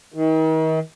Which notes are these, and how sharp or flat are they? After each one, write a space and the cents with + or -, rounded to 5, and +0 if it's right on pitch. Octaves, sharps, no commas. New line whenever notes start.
D#3 +40